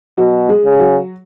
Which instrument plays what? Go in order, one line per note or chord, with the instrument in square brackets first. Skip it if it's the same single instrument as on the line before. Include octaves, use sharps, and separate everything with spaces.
[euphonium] B2 [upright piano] F#3 F#4
[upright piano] G#3 G#4
[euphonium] C#3
[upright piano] G#4
F#3 F#4